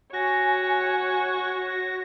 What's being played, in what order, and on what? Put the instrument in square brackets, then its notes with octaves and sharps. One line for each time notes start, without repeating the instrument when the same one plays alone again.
[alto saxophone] F#4 [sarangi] C#5 [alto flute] G#5 [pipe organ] A#6